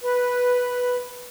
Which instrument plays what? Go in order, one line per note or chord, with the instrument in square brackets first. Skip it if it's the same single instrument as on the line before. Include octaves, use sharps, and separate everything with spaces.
[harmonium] B4